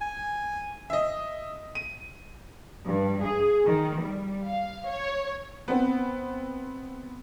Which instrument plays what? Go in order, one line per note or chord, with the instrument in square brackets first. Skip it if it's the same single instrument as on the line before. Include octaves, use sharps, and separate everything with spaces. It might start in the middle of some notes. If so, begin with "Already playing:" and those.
[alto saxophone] G#5
[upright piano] D#5 E5
D#7
[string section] G2
G#4
D#3
G3
F5
C#5
[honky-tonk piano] B3 C4